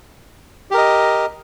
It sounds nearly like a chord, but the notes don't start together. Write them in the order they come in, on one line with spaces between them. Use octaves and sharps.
G4 A#4 D#5